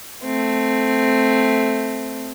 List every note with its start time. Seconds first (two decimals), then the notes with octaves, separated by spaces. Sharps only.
0.23 A3 C4